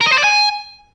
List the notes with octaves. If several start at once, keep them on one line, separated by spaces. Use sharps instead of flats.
A#4
D#5
C5
D5
G#5